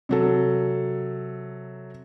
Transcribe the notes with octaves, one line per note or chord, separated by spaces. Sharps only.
C3 F#3 A4